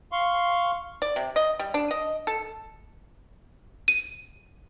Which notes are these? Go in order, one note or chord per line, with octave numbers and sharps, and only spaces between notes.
F5 C6 C#6
D5
C3
D#5
G3
D4
D#5
A4
D#7